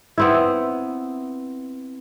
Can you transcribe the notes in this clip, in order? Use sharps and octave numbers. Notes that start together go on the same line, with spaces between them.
B3 C4 E4